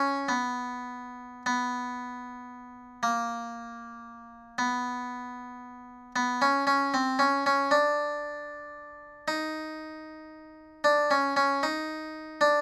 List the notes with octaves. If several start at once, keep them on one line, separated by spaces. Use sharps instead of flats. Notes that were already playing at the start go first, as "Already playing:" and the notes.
Already playing: C#4
B3
B3
A#3
B3
B3
C#4
C#4
C4
C#4
C#4
D4
D#4
D4
C#4
C#4
D#4
D4